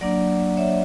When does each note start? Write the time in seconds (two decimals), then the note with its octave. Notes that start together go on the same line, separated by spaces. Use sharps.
0.01 F#3 A#3 D4 D5 F#5
0.57 C#5 E5